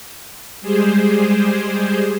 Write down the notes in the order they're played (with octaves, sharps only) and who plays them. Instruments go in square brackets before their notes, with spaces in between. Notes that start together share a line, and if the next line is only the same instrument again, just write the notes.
[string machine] G3 G#3 G4 G#4 C5